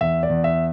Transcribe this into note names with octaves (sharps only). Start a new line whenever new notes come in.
E2 E5
D5
E2
E5